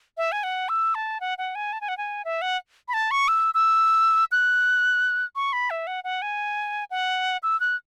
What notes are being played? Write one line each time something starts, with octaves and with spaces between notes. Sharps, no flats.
E5
G#5
F#5
E6
A5
F#5
F#5
G#5
A5
G#5
F#5
G#5
E5
F#5
B5
A5
C#6
E6
E6
F#6
C#6
B5
E5
F#5
F#5
G#5
F#5
E6
F#6